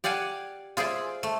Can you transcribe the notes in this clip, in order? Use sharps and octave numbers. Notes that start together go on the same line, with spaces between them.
G4 D5 F5 F#5 G#5
F4 G#4 C5 D5 E5
A3